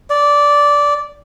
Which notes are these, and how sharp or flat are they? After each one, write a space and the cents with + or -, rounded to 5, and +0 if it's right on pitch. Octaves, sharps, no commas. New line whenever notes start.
D5 -10